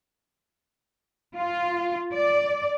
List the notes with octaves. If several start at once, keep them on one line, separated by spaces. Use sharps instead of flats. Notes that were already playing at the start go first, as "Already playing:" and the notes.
F4
D5